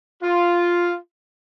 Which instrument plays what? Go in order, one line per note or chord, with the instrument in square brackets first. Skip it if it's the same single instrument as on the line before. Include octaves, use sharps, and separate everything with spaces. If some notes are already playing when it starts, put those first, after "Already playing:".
[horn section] F4